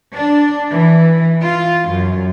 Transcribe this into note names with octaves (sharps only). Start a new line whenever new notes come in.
D4
E3
F4
F#2